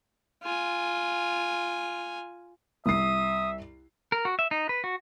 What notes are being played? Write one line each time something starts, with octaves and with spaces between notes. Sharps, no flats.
F4 G#5
C2 E5 D#6 C7
A#4
F#4
E5
D#4
B4
F#4